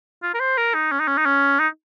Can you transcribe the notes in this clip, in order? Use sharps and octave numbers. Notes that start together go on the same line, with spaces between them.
F4
A#4
C5
A#4
D#4
C#4
D#4
C#4
D#4
C#4
D#4